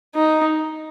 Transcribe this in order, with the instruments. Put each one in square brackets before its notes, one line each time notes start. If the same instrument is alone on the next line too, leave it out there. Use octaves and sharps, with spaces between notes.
[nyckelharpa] D#4